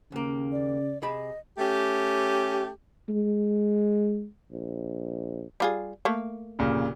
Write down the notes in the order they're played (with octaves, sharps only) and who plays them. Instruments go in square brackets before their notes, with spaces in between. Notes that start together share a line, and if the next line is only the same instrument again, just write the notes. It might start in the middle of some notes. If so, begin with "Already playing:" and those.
[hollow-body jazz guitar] D#2 A#3 [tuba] C#3
[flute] D5
[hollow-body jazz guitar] C3 G#4 B5 [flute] D#5
[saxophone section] A3 C#4 G4
[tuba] G#3
A#1
[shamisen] G3 F4 G#4
A3 A#3
[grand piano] F1 A#2 C#3